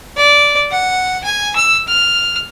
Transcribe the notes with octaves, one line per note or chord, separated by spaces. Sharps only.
D5
F#5
G#5
E6
F6